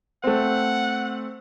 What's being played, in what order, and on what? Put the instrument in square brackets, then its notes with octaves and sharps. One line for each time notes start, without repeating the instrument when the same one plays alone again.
[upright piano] A3 C4 [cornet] F#5